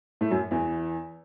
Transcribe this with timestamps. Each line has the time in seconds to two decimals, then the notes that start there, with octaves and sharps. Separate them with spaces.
0.21 A2 A3
0.31 F#2 F#3
0.51 E2 E3